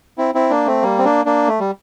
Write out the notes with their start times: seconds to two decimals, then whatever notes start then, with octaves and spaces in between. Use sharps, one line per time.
0.18 C4 E4
0.35 C4 E4
0.50 A#3 D4
0.66 A3 C4
0.82 G3 A#3
0.98 C4
1.04 A#3 D4
1.25 A#3 D4
1.48 A3
1.60 G3